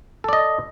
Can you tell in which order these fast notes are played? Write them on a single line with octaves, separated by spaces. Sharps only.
A4 D5 D#5